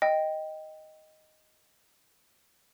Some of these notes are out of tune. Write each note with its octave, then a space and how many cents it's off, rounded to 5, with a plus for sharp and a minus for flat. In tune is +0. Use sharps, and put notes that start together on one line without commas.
D#5 +0 G5 +0